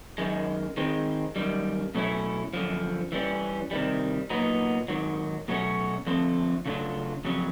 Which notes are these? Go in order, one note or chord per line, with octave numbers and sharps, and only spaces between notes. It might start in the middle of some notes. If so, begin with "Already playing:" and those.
F#2 D#3 G#3
D#3 G#3 C4
F#2 D#3 G3
B2 F#3 A3 C#4 E4
F#2 D3 F3
E3 G3 A#3 C#4
C3 D#3 G3
A#2 F#3 B3 D#4
G#2 D#3 F#3
B2 F#3 A3 C#4 F#4
D3 F3 A3 C4
C#3 F#3 A3 D4 F4
F2 C#3 F#3